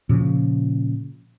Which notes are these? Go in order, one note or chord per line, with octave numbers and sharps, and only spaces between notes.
A#2 C#3 F3